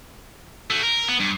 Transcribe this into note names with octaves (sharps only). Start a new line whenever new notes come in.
A3 F#4
A#4
B3
G2